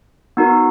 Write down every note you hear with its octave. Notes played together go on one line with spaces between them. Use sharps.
B3 D#4 F#4 A#4